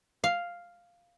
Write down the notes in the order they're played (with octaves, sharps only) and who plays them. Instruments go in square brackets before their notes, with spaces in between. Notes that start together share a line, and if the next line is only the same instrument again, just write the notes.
[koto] F5